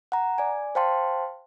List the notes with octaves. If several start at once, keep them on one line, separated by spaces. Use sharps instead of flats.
F#5 A#5
D5 G#5
C5 F5 G5 A5 C6